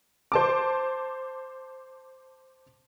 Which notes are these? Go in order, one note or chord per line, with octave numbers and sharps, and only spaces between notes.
C5 A5 D6